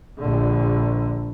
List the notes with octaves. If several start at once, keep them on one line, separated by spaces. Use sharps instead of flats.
A#1 D3